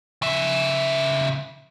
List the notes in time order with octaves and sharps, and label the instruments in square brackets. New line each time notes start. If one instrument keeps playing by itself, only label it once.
[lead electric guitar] C#3 E5